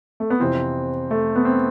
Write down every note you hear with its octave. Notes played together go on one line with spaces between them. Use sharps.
A3
B3
F2 C3 E3 C4
A3
B3
C4